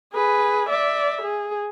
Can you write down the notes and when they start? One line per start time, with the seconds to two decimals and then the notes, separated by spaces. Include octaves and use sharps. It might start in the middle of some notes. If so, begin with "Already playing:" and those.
0.14 G#4 B4
0.70 D5 E5
1.23 G#4